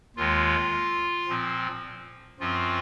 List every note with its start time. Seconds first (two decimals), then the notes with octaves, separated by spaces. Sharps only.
0.16 D#2 D#3 G#3 F4
1.28 A#2 F3 C4
2.40 F#2 F3 C4 F4